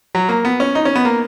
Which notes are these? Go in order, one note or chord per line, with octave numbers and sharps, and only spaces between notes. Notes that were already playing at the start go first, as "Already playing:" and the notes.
F#3
A#3
B3
C#4
D#4
C#4
B3
A#3